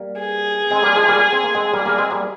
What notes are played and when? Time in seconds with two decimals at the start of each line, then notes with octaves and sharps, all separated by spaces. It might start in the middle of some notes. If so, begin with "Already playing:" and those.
Already playing: G3 A#3
0.19 G#4
0.70 G#3 C4
0.83 G3 A#3
0.96 F3 G#3
1.08 G3 A#3
1.33 C4
1.44 A#3
1.55 G#3 C4
1.73 G3 A#3
1.85 G3 A#3
1.98 G#3 C4
2.11 G3 A#3